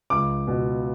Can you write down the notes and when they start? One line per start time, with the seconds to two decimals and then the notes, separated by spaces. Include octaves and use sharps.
0.10 C#2 D6
0.48 B2